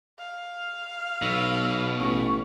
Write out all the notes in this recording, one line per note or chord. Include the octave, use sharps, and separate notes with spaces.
F5
B1 B2 E6
A1 C#6